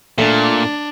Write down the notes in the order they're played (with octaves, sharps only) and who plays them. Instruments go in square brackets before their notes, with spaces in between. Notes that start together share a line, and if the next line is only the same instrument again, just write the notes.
[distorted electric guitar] A#2 [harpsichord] A3 [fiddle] D4